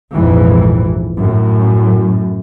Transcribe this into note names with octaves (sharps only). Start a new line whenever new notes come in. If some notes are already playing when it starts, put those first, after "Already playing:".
A#1 F2 G#2 E3
F#2 A2